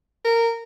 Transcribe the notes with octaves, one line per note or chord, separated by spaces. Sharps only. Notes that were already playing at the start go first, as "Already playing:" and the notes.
A#4